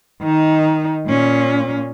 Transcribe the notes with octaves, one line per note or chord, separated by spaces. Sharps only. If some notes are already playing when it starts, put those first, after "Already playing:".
D#3 D#4
A#2 C#4